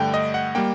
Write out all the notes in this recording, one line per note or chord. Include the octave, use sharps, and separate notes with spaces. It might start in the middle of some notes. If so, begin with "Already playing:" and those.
Already playing: G2 D3 A3 G5
D#5
F#5
G3 A#3 G5